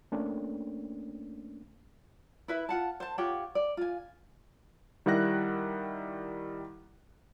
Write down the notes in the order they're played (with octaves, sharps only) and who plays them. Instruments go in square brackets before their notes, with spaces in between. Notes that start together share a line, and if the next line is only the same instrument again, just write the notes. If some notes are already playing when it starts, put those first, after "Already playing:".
[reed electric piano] A3 A#3 C#4 D4
[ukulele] E4 B4 E5
F4 F#5 A5
C5 A5
F4 G4 C#5 F#5
D5
F4 G#5
[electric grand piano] D#3 G3 E4 F#5 F#6 A#6